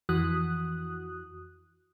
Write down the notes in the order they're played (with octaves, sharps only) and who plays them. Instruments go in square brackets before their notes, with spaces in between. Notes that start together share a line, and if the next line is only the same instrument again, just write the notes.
[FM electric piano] F2 E3 F#4 D#6 F#6